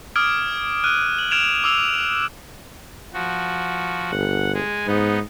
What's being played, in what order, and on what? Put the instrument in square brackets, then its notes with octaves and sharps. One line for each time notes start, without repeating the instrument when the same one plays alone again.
[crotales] D6 D#6 F6 G#6 D7
F6 F#6 D#7
F#7
F6 G#6 D7 E7 F7
D6 E6 F7
[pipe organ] F3 F#4
[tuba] G1 [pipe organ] F#5
[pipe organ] G#3 G#4
[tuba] G#2 [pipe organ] B3 D#4